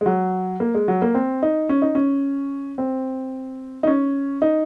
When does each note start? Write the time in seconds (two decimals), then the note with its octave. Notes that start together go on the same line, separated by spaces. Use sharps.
0.01 G#3
0.06 F#3
0.60 A#3
0.75 G#3
0.88 F#3
1.02 A#3
1.15 C4
1.43 D#4
1.69 C#4
1.82 D#4
1.95 C#4
2.78 C4
3.83 D#4
3.87 C#4
4.42 D#4